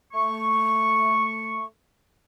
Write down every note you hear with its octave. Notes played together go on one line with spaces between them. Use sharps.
A3 C#6